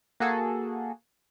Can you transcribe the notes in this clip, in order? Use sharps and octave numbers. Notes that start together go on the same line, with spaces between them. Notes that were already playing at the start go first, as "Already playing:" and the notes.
A#3 F#4 G#4 A4